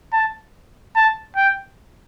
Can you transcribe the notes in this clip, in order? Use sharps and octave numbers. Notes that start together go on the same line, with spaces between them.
A5
A5
G5